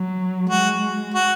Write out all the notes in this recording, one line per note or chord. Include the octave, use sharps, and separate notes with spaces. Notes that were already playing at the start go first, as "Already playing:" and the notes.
Already playing: F#3
G#3 F#4
F#4